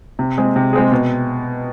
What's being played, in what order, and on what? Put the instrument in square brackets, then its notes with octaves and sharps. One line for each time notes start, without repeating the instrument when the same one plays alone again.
[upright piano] C3
G#3 C4 G#4
C3
G#3 C4 G#4
B2